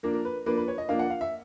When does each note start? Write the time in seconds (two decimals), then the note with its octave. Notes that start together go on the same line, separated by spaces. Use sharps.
0.03 F3 A#3 D4 A#4
0.14 A#4
0.25 B4
0.46 F3 A#3 D4 B4
0.57 B4
0.68 C#5
0.78 D#5
0.89 F3 A#3 D4 F5
0.99 F#5
1.10 F5
1.21 E5